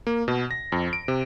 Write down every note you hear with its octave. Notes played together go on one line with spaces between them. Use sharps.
A#3
B2
A#6
F2
D7
C3